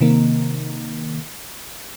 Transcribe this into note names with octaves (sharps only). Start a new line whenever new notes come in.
C3 D#3 A#3